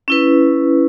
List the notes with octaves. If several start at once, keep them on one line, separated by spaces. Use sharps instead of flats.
C#4 E4 B4